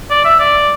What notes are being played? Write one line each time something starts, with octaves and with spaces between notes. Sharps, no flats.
D5
E5
D5